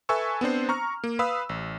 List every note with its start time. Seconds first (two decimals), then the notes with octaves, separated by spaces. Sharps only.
0.09 A4 B4 E5 G#5 C#6 E6
0.41 B3 C4 D4 C5
0.69 A#5 C#6 F6
1.04 A#3
1.19 B4 F5 B5 D#6 E6
1.49 A1